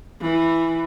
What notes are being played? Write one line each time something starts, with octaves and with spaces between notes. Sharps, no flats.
E3